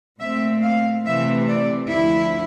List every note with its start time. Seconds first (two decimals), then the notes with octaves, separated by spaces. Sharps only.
0.20 A#2 A3 C4 E5
0.63 F5
1.05 C3 E3 A3 C4 E5
1.48 D5
1.90 D2 D3 F3 E4